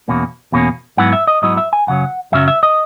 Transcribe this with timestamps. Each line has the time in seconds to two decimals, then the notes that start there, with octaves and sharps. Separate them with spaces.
0.08 E2 B2 A#3 C#4
0.52 E2 B2 A#3 C#4
0.97 G#2 F#3 B3 E4 F#5
1.13 E5
1.27 D#5
1.42 G#2 F#3 B3 E4 D#5
1.57 E5
1.73 G#5
1.87 F#2 C#3 F#3 C#4 F#5
2.32 F#2 C#3 F#3 C#4 E5
2.48 E5
2.63 D#5